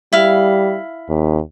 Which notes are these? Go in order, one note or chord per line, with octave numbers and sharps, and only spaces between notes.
G3 E4 F5
D#2